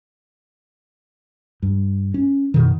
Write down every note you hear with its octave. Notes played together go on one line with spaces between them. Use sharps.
G2
C#4
F#2 B2 D#3